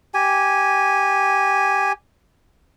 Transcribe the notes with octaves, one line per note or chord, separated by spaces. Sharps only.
G4 G#5